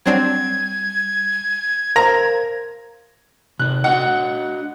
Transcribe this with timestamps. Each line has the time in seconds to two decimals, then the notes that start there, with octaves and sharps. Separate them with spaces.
0.06 F#3 G3 C4 D4 G#6
1.96 A#4 C5 F5 A#5
3.59 C3 D#4 F#6
3.84 D4 F#4 D#5 F#5